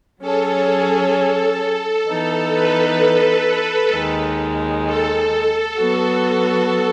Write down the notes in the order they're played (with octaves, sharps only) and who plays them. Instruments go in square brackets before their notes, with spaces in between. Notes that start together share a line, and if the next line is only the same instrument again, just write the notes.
[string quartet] F#3 C#4 G#4 C#5 [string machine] A4
[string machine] A4
[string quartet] E3 B3 D#4 [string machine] A4
[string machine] B4
[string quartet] D#2 D#3 G#3 D#4
[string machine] A4
[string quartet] F#3 B3 F#4 B4